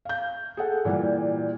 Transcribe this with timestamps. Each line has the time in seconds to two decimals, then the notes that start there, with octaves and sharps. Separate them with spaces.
0.05 F5 G6
0.57 G#4 A4 F#5
0.85 A#2 E3 G3